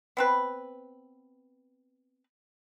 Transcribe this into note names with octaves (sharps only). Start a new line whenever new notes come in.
B3 C4 B4